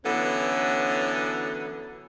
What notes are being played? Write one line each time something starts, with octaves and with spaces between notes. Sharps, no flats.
D3 E3 F#3 B3 C#4 A4